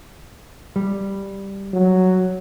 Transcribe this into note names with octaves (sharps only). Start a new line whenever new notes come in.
G3
F#3